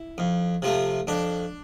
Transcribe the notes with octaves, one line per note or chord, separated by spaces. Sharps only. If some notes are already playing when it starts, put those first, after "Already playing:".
Already playing: E4
F2
C3 F3 A3
F2 D4